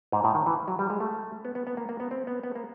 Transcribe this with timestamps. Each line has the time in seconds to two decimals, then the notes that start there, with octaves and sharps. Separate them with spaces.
0.12 G#2
0.24 A2
0.35 D#3
0.46 E3
0.68 F#3
0.79 G3
0.90 G#3
1.00 A3
1.45 B3
1.55 B3
1.67 B3
1.77 A#3
1.89 A#3
2.00 B3
2.11 C4
2.27 B3
2.44 B3
2.55 A#3